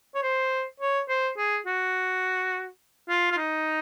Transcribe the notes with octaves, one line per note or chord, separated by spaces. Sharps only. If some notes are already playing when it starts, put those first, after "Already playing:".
C#5
C5
C#5
C5
G#4
F#4
F4
F4
D#4